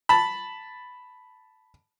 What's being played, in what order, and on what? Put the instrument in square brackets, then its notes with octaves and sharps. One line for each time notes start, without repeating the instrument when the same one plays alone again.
[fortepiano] A5 B5